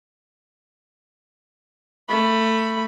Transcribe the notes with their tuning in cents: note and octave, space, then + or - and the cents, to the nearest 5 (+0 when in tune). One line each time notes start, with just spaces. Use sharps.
A3 +20 B5 +0